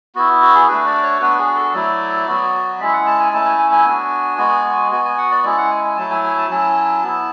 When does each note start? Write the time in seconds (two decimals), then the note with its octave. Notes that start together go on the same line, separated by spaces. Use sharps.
0.15 B3 E4 F#4
0.42 F#4
0.55 G#4
0.68 A3 D4 F#4 B4
0.86 D5
1.03 C#5
1.21 B3 D4 F#4 B4
1.39 G#4
1.56 A4
1.73 F#3 A3 E4 D5
2.27 F#3 B3 F#4
2.80 G#3 C#4 E4 E5
2.93 F#5
3.06 A5
3.20 G#5
3.33 A3 C#4 E4 A5
3.46 G#5
3.58 G#5
3.72 G#5
3.85 B3 D4 F#4
4.38 G#3 B3 F#4
4.91 B3 F#4 G#5
5.05 G#5
5.18 F#5
5.31 D5
5.44 G#3 C#4 E4 D5
5.58 F#5
5.71 G#5
5.84 G#5
5.97 F#3 A3 E4 A5
6.11 G#5
6.24 G#5
6.38 A5
6.50 F#3 C#4 E4 A5
7.02 B3 E4